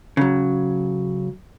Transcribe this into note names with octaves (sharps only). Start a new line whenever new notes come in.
C#3 F#3